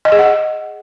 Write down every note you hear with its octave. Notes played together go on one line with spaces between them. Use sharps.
D#5
G#4
F#5